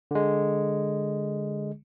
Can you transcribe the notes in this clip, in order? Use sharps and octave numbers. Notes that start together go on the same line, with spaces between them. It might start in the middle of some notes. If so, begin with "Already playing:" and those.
D3 G#3